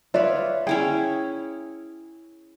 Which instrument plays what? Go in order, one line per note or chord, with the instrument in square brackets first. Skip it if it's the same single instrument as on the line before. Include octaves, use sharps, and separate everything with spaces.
[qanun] F4 B4 [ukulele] C#5 D5 E5
[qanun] C#4 E4 G#4 [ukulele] G5